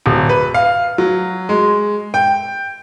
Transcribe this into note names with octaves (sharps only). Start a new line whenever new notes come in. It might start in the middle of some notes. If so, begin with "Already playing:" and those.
D1
B4
F5
F#3
G#3
G5